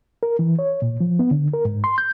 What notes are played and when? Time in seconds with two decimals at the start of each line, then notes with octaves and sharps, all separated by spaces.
0.23 A#4
0.39 E3
0.59 C#5
0.82 A#2
1.01 F3
1.19 B3
1.31 D3
1.54 A#4
1.65 G#2
1.84 C6
1.98 G6